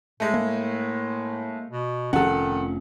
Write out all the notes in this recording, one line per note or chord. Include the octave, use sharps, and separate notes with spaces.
A2 G#3 A3
A#3
B2
F1 D#3 F3 C#4 A4 F#5